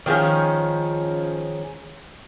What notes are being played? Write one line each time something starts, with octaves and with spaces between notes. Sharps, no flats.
D#3 F3 G#3 C#4